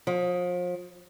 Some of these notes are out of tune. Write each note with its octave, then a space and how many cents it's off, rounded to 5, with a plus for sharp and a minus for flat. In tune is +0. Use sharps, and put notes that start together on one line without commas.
F3 +35